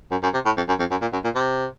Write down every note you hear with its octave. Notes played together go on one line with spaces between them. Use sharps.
F#2
F#2
C3
A2
F2
F#2
F2
F#2
A#2
F#2
A#2
C3